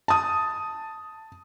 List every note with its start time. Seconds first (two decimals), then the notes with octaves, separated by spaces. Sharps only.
0.08 A5 D#6